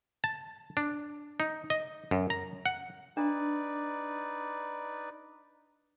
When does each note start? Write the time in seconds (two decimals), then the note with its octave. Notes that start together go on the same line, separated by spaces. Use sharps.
0.24 A5
0.77 D4
1.40 D#4
1.70 D#5
2.11 F#2
2.30 A#5
2.66 F#5
3.17 D4 D#4 B4 D5